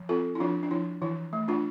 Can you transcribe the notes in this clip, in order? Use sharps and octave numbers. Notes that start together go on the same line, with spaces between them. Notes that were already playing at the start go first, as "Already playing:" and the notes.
Already playing: F3
C4 F4 A4
E4
F3 D4 F4
D4
F3 E4
E3 E4
A3
D4 F4